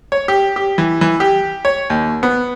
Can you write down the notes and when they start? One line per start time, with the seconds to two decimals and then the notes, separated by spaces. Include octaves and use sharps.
0.12 C#5
0.28 G4
0.56 G4
0.78 E3
1.01 E3
1.20 G4
1.65 C#5
1.90 D#2
2.23 B3